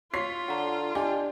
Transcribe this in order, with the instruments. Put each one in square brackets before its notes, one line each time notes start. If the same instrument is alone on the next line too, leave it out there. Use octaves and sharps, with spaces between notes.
[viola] F4 [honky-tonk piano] C#5 B6 C7 [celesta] C6
[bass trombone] D3 [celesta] F#5 A#5
[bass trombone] D4 [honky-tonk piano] G4 [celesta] D#5 G#5 D6